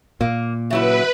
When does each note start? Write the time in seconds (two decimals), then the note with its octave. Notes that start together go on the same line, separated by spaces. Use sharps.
0.21 A#2 A#3
0.70 C#3 F#3 E4 B4 E5